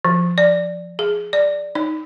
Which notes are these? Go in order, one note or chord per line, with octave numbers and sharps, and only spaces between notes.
F3
D5
G#4
D5
D#4